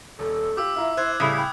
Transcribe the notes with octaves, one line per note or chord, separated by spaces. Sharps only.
D#1 A4
F4 G4 D6 E6
E4 F4 E5 A#5
E4 C5 E6 F#6 G#6
A2 C#3 G3 E4 A4 D#6
G5 B5 G6